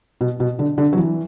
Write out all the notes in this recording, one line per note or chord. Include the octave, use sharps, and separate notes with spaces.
B2
B2
D3
D3
F#3
E3